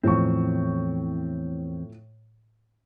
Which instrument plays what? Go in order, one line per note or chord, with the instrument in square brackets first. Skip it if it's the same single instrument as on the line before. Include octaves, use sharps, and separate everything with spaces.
[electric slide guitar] E2 C4 [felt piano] A2 F3 C#6